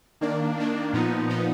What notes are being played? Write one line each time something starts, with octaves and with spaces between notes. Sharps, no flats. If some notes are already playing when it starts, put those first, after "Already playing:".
D#3 A#3 D4
D#3 A#3 D4
A#2 F3 B3 D#4
A#2 F3 B3 D#4